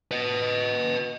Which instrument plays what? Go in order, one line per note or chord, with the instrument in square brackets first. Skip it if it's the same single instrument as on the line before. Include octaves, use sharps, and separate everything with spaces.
[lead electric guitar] B4 D#5